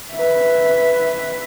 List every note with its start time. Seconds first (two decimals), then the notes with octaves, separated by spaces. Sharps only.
0.14 B4 E5